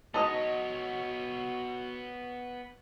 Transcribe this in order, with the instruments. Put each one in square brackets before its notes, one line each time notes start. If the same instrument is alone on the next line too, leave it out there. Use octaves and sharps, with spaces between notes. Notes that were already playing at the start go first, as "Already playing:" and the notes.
[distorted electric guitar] B3 C#5 [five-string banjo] D#4 D#5 [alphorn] F#4 [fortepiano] A5 D#6